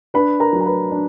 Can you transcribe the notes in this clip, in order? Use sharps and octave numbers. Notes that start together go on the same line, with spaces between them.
D4 B4 B5
A#4 A#5
F#3
A#5
B4 B5
D4